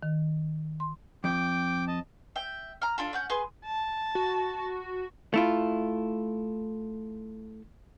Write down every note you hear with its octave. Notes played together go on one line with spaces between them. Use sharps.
D#3
C6
F2 G5 D6
D#5 A5
E5 G5
A#5 F6
D4 F4 A4
C#4 F#5 G6
G#4 B4 C6
A5
F#4
A3 E4 F4